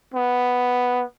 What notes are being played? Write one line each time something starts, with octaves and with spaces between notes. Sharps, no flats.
B3